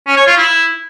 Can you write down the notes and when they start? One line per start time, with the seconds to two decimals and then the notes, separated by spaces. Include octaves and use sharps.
0.07 C#4
0.17 C#5
0.27 F4
0.37 E4